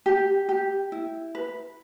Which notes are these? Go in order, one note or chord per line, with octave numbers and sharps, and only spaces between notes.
G4
G4
E4
B4